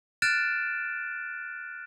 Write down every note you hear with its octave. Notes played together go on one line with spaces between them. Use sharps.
F6 F#6 A6 D7 E7